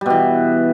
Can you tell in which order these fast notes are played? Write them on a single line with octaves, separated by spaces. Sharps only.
G3 B2 E3